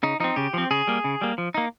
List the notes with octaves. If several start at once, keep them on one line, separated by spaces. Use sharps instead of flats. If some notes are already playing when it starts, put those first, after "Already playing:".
C#3 D#4
F3 C4 D#4
C#3 G4
F3 C4
C#3 G#4
G3 A#3
C#3
G3 A#3
F3
A#3 D#4